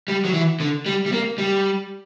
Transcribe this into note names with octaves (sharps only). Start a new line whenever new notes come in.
G3
F#3
E3
D3
G3
G3
A#3
G3